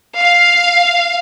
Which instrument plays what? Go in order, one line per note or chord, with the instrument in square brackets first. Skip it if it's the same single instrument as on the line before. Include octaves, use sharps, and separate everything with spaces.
[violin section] F5